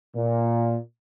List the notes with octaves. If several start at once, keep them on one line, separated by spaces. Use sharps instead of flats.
A#2